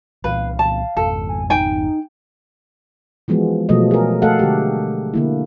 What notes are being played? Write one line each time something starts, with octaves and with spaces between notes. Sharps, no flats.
C2 A#2 E3 B4 F5
A5
G#1 F2 A4
G#5
D#4 G5 G#5
E3 F3 G#3 B3 F#4
B2 F3 F#3 A3 D#5
G#4 A#4
A3 A4 D#5 F5 F#5
D3 G#3 G4
D3 A#3 E4